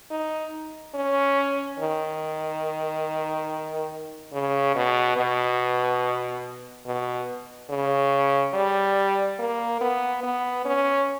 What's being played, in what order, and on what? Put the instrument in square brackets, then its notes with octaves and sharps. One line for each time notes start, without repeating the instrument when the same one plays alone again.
[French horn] D#4
C#4
D#3
C#3
B2
B2
B2
C#3
G3
A#3
B3
B3
C#4